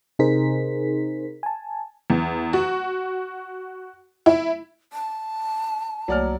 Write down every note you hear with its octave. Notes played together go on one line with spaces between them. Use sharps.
C3 D#4 G#4 A#4 C5 B6
G#5 A5
E2
F#4
E4
A5
C2 F#3 A3 A#3 C#5 D5 F6